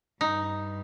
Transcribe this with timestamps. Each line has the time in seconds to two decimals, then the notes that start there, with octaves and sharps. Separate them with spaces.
0.21 G2 D#4